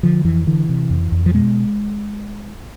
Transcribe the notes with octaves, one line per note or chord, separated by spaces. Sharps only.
D3 F3
F2 E3
D3 E3
C3
F2
F2
F3
B2 G#3